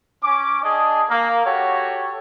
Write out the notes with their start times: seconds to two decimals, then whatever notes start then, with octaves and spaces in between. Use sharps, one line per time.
0.23 C#4 D6
0.63 D4 G#4 D#5 A5
1.09 A#3
1.45 F#4 G4 A4 C#5